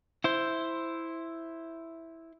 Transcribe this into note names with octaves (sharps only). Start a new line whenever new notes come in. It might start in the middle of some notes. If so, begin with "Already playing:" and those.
E4 C5